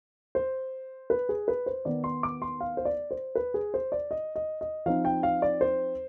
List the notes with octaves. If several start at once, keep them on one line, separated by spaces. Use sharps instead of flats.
C5
B4
G#4
B4
C5
D#3 B3 D#4 D5
C6
D6
C6
F5
C5
D5
C5
B4
G#4
C5
D5
D#5
D#5
D#5
F3 C4 D#4 F5
G5
F5
D5
C5